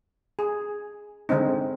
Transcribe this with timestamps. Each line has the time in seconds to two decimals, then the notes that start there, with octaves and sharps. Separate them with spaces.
0.39 G#4
1.29 D3 G#3 C4 D#4